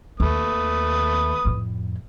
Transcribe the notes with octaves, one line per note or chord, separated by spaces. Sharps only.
D#2 A3 B4 D#6
F2 A2